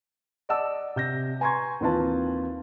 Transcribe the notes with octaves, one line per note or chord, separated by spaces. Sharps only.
D5 D#5 F#5 A5 D6 E6
C3 G6 A#6
B4 G#5 A#5 C6 C#6 G#6
D#2 E3 C4 F4 B4 A5